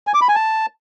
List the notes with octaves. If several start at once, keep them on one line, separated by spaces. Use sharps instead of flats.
G#5
D6
B5
G#5
A5